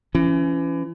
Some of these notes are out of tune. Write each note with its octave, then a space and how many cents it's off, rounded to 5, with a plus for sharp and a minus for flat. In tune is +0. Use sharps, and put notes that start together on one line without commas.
E3 +35 C#4 +0